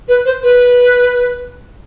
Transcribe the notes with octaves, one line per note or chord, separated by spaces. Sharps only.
B4
C5
B4